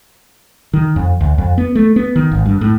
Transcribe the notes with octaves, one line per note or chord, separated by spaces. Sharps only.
D#3
F2
D2
F2
B3
A3
B3
D#3
G#1
G2
A2